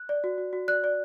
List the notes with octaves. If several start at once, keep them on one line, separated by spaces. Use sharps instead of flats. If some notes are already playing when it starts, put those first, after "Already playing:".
Already playing: F#6
D5
F#4
F#4
F#4
D5 F#6
D5